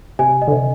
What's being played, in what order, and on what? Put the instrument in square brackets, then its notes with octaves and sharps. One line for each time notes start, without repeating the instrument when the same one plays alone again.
[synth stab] C3 [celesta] G#5
[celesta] D#5
[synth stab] D3
C3